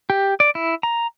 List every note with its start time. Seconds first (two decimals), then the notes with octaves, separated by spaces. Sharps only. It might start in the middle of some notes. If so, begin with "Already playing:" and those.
0.10 G4
0.40 D5
0.55 E4
0.83 A#5